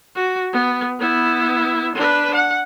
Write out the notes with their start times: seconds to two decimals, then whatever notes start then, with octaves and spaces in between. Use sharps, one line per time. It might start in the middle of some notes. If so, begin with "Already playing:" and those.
0.16 F#4
0.53 B3
0.99 B3 E4
1.95 D4 B4
2.34 F#5